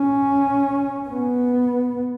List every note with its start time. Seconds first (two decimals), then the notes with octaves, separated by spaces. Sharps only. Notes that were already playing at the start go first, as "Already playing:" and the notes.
Already playing: C#4
1.09 B3